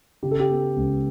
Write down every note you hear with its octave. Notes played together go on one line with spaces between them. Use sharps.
C#3 G4
A4
G4
B3
C#2